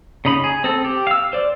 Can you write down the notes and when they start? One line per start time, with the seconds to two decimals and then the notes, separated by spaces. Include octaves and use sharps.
0.25 C#3 D#4 B5
0.44 G#4
0.64 C4 A4
0.85 G4
1.07 F5 E6
1.33 C5 D5